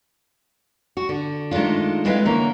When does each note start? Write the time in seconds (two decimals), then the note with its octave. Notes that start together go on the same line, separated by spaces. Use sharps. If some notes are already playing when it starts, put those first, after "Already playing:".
0.97 F#4
1.09 D3
1.51 D#3 G#3 A3 D4 F4
2.06 G#3 C4 E4 B4 E5 F5
2.25 D3 E3 A#3 C#4